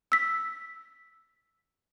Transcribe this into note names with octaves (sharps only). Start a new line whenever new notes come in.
E6 B6